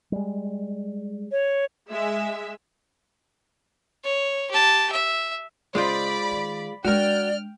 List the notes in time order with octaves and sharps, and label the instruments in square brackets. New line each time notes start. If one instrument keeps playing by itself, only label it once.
[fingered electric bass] G3 G#3
[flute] C#5
[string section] G#3 E5
[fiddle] C#5
G4 A5
E5
[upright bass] C#3 [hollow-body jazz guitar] G#3 F4 C5 [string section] D5 B5
[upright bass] D#3
[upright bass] G#3 D4 [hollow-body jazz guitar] F#4 A#4 [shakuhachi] D5 [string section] G5 F6